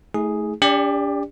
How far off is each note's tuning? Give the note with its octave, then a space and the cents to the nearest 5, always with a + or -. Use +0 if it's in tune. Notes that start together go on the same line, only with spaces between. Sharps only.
A3 -15 D#4 +45 G#4 +0
D4 -40 G4 +30 D5 +0